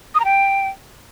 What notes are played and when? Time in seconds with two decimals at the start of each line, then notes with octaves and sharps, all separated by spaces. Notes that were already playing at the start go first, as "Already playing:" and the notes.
0.15 D#6
0.20 A#5
0.25 G5